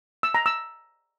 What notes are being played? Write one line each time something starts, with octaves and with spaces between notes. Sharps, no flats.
E6
A#5
E6